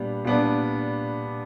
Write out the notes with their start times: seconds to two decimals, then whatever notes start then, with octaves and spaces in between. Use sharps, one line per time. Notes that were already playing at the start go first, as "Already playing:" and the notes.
Already playing: A#2 G3 B3 D4
0.24 A#2 G3 B3 D4